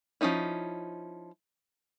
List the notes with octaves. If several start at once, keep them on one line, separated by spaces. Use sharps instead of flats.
F3 G3 C#4 D#4 E4